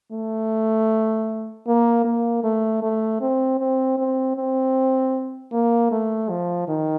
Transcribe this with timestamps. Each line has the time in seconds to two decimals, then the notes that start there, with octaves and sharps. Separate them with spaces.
0.12 A3
1.67 A#3
2.05 A#3
2.44 A3
2.83 A3
3.21 C4
3.59 C4
3.98 C4
4.36 C4
5.52 A#3
5.92 A3
6.30 F3
6.68 D#3